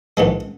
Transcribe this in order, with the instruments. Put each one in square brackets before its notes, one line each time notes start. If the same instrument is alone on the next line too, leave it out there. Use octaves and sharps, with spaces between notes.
[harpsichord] A#1 G#2 E3 G#3